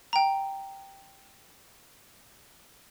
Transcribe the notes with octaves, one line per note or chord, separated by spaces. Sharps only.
G5 A#5